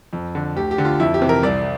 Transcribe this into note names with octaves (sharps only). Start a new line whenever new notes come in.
F2
D3
D2 G4
G4
D3
F4
F2 E4
G4
C3 E3
A#4
C2 D5